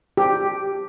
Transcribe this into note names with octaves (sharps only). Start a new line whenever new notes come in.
G4